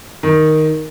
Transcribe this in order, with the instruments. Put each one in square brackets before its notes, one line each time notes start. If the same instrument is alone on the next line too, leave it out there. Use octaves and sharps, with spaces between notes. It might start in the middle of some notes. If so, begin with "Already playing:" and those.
[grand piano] D#3